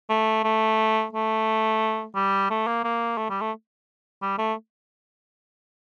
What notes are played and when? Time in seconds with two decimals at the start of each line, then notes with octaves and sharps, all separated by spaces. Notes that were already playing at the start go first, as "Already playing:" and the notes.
0.09 A3
0.44 A3
1.13 A3
2.15 G3
2.50 A3
2.67 A#3
2.84 A#3
3.18 A3
3.30 G3
3.41 A3
4.22 G3
4.38 A3